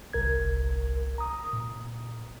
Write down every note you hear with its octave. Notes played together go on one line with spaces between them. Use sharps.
G1 C2 A#4 G#6
A#5 D#6
A#2